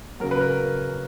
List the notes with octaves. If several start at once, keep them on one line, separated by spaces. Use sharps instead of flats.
C#3 F#3 A#4
B4
A#4